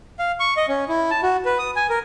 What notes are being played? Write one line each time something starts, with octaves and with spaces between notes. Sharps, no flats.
F5
C#6
D#5
C#4
E4
A5
F#4
B4
D#6
G#5
A#4